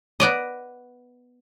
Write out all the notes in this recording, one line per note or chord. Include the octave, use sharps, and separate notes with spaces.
B3 D5 D#5